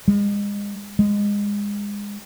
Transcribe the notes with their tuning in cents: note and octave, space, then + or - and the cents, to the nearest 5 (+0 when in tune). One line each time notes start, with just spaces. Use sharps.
G#3 -35
G#3 -25